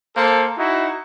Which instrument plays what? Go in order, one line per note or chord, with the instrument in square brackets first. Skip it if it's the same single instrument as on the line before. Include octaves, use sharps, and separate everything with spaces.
[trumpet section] A#3 A4 C5
D#4 E4 F#4